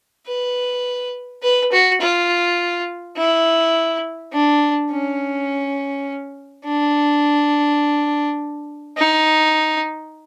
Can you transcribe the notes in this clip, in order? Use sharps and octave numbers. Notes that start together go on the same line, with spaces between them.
B4
B4
F#4
F4
E4
D4
C#4
D4
D#4